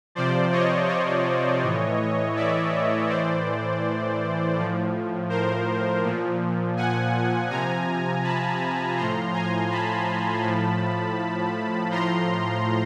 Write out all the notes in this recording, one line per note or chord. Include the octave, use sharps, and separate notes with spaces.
C3 F3 C5 D5
C#5 D#5
C#5 D#5
A2 E3
D5 E5
A2 E3 C5 D5
A2 F3
A#4 C5
A#2 F3
F#5 G#5
C3 F3 G#5 A#5
A5 B5
A2 F3 A#5 C6
G#5 A#5
A5 B5
A2 F3
A2 F3 A#5 C6